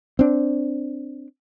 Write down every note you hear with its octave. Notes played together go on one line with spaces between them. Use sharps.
C4 D4